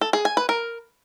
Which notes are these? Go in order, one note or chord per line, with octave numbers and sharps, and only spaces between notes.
A4
G#4
G#5
B4
A#4